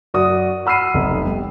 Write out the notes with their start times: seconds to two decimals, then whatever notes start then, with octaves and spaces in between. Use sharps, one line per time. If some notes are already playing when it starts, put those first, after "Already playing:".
0.14 F#2 F#4 D5 D#6
0.66 F#5 B5 E6 F6 C7 D#7
0.94 F1 B1
1.25 G3